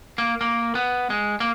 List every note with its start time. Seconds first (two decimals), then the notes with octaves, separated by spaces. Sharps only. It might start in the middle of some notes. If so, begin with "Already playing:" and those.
0.18 A#3
0.41 A#3
0.75 B3
1.10 G#3
1.40 A#3